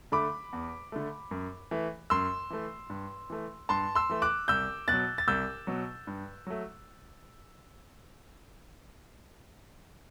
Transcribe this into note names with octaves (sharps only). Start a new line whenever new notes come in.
D3 A3 B5 D6
E2
D3 A3
F#2
E3 A3
F#2 C6 E6
E3 A3
G2
E3 A3
G2 A5 C6
C6 E6
E3 A3
D6 F#6
C2 E6 G6
B2 F#3 F#6 A6
A6
C2 E6 G6
B2 F#3
G2
F#3 A3